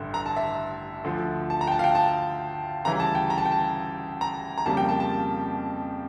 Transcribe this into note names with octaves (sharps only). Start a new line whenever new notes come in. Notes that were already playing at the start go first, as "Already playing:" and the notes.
Already playing: A1 G2 D3
A#5
A5
E5
D2 D3 F3
A5
A#5
G5
A5
F5
G5
A5
D2 C#3 E3 G3 A#5
A5
G5
A#5
A5
G5
A5
A#5
A#5
F2 C#3 G3 A#3 A5
G5
A5
A5